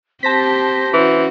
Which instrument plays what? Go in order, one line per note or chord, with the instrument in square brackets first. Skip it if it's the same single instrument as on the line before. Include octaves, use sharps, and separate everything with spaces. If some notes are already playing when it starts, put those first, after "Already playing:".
[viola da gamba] C4 G4 [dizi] C5 [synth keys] A5 A#6 B6
[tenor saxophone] E3 [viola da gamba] C#4 F#4